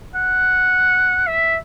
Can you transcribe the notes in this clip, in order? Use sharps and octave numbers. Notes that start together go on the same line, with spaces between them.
F#5
E5